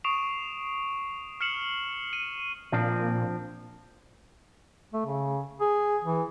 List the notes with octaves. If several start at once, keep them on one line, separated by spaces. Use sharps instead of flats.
C#6 D#6 C7 D7 E7 F7
F6 C7 C#7 E7 F#7
D#7
A#2 F3 C4 D4
A3
C#3
G#4
E3